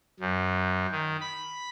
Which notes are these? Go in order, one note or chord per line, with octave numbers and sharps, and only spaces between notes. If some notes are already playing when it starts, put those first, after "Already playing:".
F#2
D#3
B5